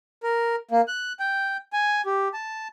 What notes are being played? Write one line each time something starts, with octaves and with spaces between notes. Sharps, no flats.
A#4
A#3
F#6
G5
G#5
G4
A5